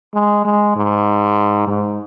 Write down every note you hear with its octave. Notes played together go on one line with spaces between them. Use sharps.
G#3
G#3
G#2
G#2